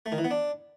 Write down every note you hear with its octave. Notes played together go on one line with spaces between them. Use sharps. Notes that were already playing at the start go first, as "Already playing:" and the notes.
A3
D#3
E3
B3
D4